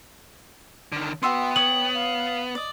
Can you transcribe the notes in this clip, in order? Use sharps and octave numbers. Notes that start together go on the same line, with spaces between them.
D3 D#3
B3 F#4 E5 G5 C6
C#5 D#6 F#7
F5
D5 D#5